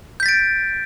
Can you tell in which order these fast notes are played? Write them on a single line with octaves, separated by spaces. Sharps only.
G6 B6 A6 D7